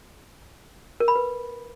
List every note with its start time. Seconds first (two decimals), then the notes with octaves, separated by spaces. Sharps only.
1.00 A#4
1.08 B5
1.16 B4